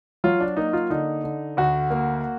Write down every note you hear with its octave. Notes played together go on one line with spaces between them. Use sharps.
F#3 F4
D4
A#3 D#4
F4
D3 D#4
D3
D2 F#4
A#3